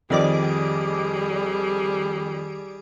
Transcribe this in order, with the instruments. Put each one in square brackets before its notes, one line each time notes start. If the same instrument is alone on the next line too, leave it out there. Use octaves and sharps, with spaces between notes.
[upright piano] F2 F3 D#5 [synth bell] D#3 D5 D6 [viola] G3 G#4